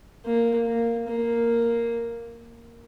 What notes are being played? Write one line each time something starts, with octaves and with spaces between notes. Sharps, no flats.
A#3
A#3
A#3